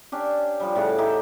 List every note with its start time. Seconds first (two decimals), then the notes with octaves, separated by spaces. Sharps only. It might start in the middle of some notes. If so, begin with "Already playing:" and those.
0.12 C#4 D4 G4
0.60 F3 G3
0.75 A2 C#3 F#5 D6
0.98 D#4 E4 G4 G5